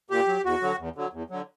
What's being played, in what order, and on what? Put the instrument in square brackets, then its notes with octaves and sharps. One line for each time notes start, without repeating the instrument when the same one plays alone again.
[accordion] A#2 G4
F#3
E2 F#4
D3 F#3
E2
D3 F#3
E2
D3 F#3